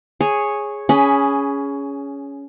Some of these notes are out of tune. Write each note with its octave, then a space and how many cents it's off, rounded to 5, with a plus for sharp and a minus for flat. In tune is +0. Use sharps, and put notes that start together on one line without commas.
G#4 +0 C#5 -5
C#4 +15 G#4 +0 B5 +0